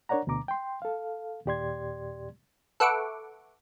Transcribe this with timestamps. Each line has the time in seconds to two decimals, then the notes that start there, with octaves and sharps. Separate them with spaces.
0.09 D4 A#4 C#5 D5 F#5 A#5
0.27 D2 B2 D3 A#5 D6
0.48 G5 C6
0.82 A4 F5
1.46 D#2 A#2 G4 D5 C6 G#6
2.80 A4 B4 E5 F#5 C#6 D6